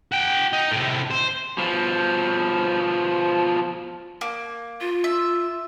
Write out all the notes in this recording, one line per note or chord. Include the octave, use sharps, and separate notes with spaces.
F#4 G5
D#4
A2 C3
C5
B2 F3
A#3
F4
E5